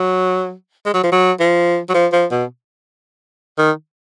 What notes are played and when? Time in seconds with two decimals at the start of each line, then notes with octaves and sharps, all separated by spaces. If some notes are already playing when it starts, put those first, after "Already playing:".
Already playing: F#3
0.86 G#3
0.94 F#3
1.04 F3
1.12 F#3
1.40 F3
1.89 F#3
1.94 F3
2.13 F3
2.31 B2
3.58 D#3